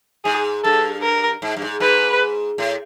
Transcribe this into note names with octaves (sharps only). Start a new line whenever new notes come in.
G#2 G#4
G2 A4
A#4
G#2
G2
G#2
G#2 B4
A2